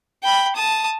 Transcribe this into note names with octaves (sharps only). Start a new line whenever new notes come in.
G5 B5
A5 D#6